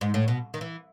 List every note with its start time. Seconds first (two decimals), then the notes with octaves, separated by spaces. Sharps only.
0.01 G#2
0.14 A2
0.28 B2
0.54 D#3
0.61 E3